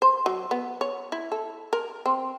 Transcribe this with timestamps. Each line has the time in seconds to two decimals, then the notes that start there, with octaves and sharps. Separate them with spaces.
0.02 C5
0.26 F#3
0.51 B3
0.81 C#5
1.12 E4
1.32 A4
1.73 A#4
2.06 C4